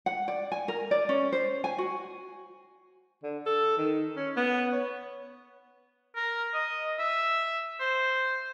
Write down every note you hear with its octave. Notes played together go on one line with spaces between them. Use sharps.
F#5
D5
G#5
A#4
D5
C#4
C5
G#5
F#4
D3
A4
D#3
C#4
B3
C#5
A#4
D#5
E5
C5